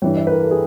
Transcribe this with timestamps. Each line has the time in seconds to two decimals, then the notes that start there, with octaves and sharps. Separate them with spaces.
0.02 G2 E3 G3 C#5
0.17 E5
0.27 B4
0.32 A#4
0.41 A4
0.51 G#4